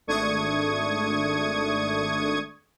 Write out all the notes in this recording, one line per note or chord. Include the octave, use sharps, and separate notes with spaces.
G#1 A3 D4 C#6 D#6 G#6